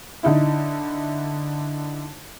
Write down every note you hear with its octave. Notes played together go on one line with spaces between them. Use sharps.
D3 D#4 E4